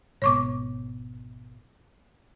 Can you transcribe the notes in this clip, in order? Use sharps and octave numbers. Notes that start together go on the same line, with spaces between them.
G#1 B2 C#5 C#6 D6